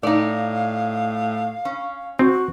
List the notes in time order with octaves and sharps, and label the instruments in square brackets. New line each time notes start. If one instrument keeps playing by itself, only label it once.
[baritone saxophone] A2 [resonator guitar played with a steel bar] D#4 D5 [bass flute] F5
[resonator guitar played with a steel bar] C#4
[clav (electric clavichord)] C4 [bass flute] F#4